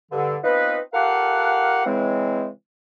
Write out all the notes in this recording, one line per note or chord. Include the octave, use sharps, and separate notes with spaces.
G2 D3
B3 C4 D#4 F4 B4
F4 G4 A4 A#4 F5 F#5
C#3 E3 G#3 C4